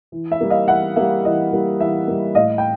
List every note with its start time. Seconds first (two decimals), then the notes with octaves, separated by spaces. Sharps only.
0.12 E3
0.31 E5
0.40 G3 A#3
0.50 D#5 F5
0.68 E3 E5 F#5
0.96 G3 A#3 E5
1.25 E3 D#5
1.52 G3 A#3
1.80 E3 E5
2.07 G3 A#3
2.35 A2 D#5 F5
2.58 G5